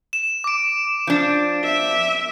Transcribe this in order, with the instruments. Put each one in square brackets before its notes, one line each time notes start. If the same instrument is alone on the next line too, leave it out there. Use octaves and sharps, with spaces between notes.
[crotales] E7
D6 D7
[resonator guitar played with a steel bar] F3 D4
[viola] E5